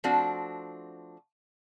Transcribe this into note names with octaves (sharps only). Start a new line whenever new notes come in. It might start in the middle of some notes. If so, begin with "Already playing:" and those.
F3 A3 C4 D4 F#4